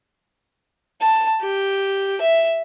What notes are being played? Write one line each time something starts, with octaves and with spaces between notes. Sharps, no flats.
A5
G4
E5